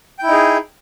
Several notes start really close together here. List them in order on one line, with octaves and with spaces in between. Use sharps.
G5 E4 D#4 G#4